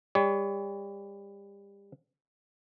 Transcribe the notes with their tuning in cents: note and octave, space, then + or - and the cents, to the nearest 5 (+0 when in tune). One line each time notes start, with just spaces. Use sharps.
G3 +30 C#5 +35